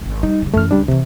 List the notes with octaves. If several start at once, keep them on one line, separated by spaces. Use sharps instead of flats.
D#1 G#1
G3 D#4
C#3 G3
F#2 E3 A3 F6
C#2 G3 D4
C3 E3 C4